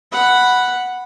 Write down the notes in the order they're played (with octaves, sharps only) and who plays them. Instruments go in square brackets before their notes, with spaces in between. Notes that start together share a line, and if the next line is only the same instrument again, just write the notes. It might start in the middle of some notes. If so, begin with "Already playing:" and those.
[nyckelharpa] F#5 B5